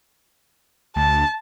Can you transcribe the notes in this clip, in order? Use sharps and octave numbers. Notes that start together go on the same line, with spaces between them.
D2 A5